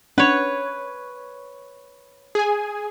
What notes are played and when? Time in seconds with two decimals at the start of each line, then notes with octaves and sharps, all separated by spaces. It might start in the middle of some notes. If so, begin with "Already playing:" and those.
0.18 C#4 D4 B4 C#5 F#5
2.35 G#4 G#5